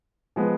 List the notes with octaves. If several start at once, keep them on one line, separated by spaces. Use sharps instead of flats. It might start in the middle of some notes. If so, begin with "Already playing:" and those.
F3 G#3 B3